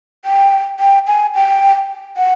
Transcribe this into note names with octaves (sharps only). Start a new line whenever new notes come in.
G5
G5
G#5
G5
F#5